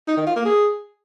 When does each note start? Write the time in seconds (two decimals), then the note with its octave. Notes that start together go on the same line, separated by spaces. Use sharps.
0.08 D#4
0.17 D#3
0.26 F4
0.36 A#3
0.45 G#4